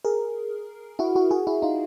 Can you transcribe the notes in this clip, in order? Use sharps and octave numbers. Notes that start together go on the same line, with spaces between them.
G#4 A#4
E4 F#4
E4 F#4
F#4 G#4
E4 F#4
D#4 F4